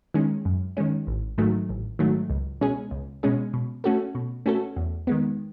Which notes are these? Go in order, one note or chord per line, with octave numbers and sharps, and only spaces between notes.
D#3 G#3 C#4
F#2
D#3 G#3 C#4
A1
G#2 D#3 F#3 A3
A1
G#2 D#3 F#3 A3
C#2
B2 G#3 C#4 G#4
C#2
B2 G#3 C#4 G#4
B2
A3 C#4 F#4 A4
B2
A3 C#4 F#4 A4
E2
D#3 G#3 B3